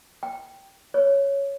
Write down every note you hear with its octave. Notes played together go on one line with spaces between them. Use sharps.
G5
C#5